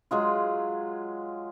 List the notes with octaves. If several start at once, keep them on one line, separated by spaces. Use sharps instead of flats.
F#3 G#3 F4